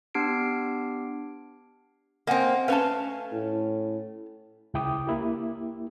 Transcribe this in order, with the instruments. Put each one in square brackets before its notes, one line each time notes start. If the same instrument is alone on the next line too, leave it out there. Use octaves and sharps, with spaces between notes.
[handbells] B3 D4 G4 C7 D7
[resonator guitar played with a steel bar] A#3 C4 [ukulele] D#5 F#5 G#5
[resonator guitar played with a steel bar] A3 C#4 F5 [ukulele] B4 A5
[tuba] A2
[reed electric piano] C#2 C#3 E4 G5 D6 D#6
A#3 E4 G4